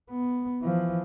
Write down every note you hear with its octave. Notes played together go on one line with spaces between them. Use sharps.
B3
E3 F3